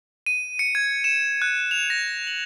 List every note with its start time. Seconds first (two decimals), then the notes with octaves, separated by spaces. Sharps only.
0.26 D#7
0.59 C#7
0.75 G#6
1.04 E7
1.42 F#6
1.71 F7
1.90 A#6
2.27 F#7